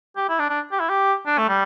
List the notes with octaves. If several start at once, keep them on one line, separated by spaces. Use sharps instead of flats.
G4
E4
D4
D4
G4
E4
G4
D4
A3
G3